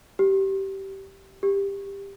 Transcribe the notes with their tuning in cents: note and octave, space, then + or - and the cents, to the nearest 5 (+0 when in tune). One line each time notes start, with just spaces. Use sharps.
G4 -20
G4 +15